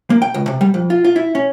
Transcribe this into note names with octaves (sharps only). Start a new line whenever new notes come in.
A#3
G5
C#2
C3
G3
F2
F4
F4
E4
C#4